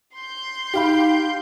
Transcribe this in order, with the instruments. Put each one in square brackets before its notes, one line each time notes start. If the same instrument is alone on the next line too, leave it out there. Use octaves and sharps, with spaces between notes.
[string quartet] C6 G6
[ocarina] D#4 [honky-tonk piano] G4 F5 B5